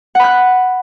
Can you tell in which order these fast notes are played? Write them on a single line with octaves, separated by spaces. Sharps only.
F#5 B5 F#6